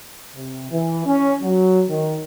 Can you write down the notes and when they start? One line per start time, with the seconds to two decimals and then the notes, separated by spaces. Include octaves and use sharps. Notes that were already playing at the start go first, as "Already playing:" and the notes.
0.35 C3
0.71 E3
1.06 C#4
1.42 F#3
1.88 D#3